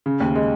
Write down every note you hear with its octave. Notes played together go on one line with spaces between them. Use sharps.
C#3
D#2
G#3